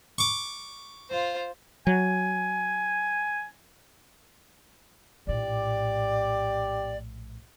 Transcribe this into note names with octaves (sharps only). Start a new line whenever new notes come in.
C#6 D6
F4 C5
F#3 G#5
A#1 A2 G4 D5